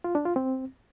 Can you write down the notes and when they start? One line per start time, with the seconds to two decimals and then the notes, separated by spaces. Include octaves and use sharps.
0.04 F4
0.15 D4
0.25 F4
0.36 C4